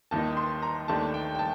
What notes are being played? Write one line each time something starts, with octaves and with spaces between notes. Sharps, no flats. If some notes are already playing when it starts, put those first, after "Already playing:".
D#2 D#3 A#3 D#4 A5
C6
A#5
D#2 D#3 A3 D4 A5
G5
G5
A5